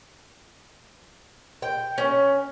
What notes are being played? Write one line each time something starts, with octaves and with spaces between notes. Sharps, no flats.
G5
C#4